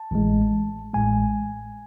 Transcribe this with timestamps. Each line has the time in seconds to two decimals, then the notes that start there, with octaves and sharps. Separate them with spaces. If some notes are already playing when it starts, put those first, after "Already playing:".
Already playing: A5
0.11 A1 A2 G#3
0.94 A1 A2 G#3 G#5